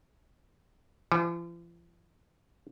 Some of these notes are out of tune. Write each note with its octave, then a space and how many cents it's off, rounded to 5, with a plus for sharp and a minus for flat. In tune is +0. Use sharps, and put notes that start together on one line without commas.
F3 -45